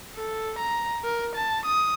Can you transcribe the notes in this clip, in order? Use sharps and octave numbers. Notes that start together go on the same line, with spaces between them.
A4
A#5
A#4
A5
D#6